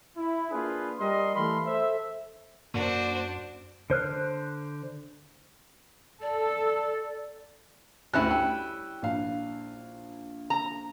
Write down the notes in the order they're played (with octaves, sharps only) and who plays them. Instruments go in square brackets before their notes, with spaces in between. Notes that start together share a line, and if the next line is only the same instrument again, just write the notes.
[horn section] E4
A#3 D4 F4 G#4 B4
G3 G4 A#4 D#5 C6
E3 A3 F5 B5 C6
A4 C5 E5
[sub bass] F#2 [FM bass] A#3 [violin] D4 [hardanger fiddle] F#4 C5
[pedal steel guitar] D3 C5 F6 F#6
[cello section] A4 [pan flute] D5
[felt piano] D2 F#6 [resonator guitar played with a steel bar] G3 C#4 E4
[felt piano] G5
A#1 F5
[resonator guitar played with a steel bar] A#5